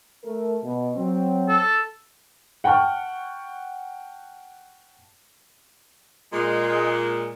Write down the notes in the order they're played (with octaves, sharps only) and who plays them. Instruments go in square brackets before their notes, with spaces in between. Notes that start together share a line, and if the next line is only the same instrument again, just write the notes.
[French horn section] A3 A#4
B2
F#3 C4
[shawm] A4
[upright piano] F#5 G5 A5 C#6 F6
[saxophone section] A#2 G#3